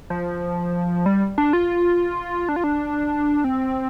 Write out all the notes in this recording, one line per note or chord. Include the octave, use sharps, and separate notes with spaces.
F3
G3
D4
F4
D4
F4
D4
C4